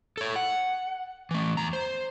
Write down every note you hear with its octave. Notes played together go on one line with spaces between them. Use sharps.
A4 C#5
F#5
E3 A3
E2 A#5
C5